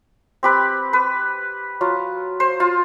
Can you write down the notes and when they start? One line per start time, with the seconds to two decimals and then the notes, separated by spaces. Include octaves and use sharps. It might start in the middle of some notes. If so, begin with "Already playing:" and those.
0.43 C4 G4 B4
0.93 B4
1.81 F#3 F4
2.40 C5
2.60 F4